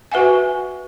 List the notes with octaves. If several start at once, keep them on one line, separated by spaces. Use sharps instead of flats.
F#4 B4 E5 F#5 G#5